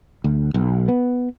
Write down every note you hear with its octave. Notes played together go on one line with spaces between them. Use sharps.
D2
B1
B3